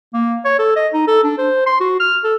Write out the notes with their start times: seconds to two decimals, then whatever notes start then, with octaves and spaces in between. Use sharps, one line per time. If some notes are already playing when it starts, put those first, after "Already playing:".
0.14 A#3
0.45 C#5
0.59 A4
0.76 D#5
0.93 D#4
1.08 A4
1.24 D4
1.38 C5
1.66 C6
1.80 F#4
2.00 F6
2.24 A4